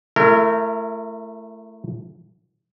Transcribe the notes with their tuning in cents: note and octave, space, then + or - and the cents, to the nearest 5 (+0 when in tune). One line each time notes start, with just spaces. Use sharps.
A3 +0 E4 +35 A#4 -25